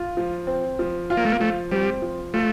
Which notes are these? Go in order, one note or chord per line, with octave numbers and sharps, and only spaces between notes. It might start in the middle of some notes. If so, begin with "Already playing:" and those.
Already playing: F4
F3
C4
F3
F4
A#3
A3
A#3
F3 A3
G3 C4
F3
A3 F4